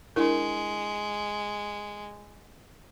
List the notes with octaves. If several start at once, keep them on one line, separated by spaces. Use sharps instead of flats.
G#3 D4 E4 A#4